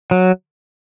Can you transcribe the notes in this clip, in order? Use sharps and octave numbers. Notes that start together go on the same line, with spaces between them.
F#3